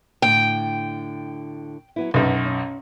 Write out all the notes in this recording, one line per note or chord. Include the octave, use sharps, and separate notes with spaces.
A2 D3 G5
F#3 B3 E4
B1 F#2 B4
C#4